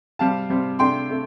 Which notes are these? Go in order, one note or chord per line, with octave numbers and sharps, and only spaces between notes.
C3 G3 C4 F5 A5
C3 G3 C4
C3 A3 D4 G5 C6
C3 A3